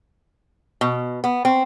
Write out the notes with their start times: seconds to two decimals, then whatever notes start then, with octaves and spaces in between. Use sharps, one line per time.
0.81 B2
1.24 B3
1.45 C4